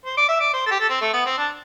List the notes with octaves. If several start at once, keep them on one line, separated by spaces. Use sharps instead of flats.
C5
D5
E5
D5
C5
A4
G4
A4
C4
A3
B3
C4
D4